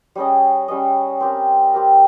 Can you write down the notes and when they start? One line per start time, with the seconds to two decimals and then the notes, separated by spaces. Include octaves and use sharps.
0.15 G3 C#4 G#4 D#5
0.68 G3 C#4 G#4 D#5
1.20 C4 G4 A#4
1.74 C4 G4 A#4